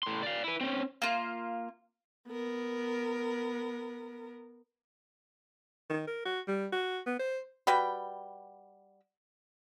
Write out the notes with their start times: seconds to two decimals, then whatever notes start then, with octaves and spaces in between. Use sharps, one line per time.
0.03 A2 C6
0.23 D5 F5
0.44 E4 B4
0.61 C4 C#4
1.02 A#3 F4
2.29 B3 A#4
5.90 D#3
6.08 A#4
6.25 F#4
6.48 G3
6.72 F#4
7.06 B3
7.19 C5
7.67 G3 F#4 B4 G5